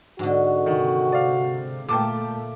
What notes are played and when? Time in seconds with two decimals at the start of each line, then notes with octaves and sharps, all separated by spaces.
0.19 G#2 D3 F#4
0.66 C3 D#3
1.12 D5 F5
1.89 A#2 A3 A#3 A4 G5 A5 D6